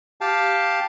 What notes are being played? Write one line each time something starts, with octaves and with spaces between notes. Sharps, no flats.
G4 F5 G5 A5